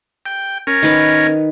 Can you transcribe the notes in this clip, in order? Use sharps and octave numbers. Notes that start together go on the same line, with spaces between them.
G5
C#4 A#4
D#3 B4